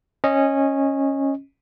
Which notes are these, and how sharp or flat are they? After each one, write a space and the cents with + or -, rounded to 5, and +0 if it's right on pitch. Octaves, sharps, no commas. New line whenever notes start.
C#4 -15 D#5 +0